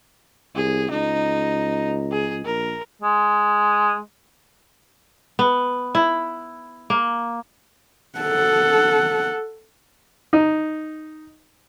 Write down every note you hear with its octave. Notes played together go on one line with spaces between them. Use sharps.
C2 G#4
C#2 D#4
G#4
A#1 A#4
G#3
B3
E4
A#3
A4 F#5
D#4